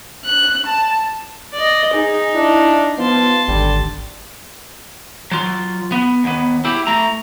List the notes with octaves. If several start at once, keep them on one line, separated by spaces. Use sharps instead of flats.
F#6
A5
D5 D#5
D#4 G#4
D4 E4
F3 B3 A5 C6
G#1 D3 G3
F#3 F4
B3
D#2 B3
E4 G4
A3 A#5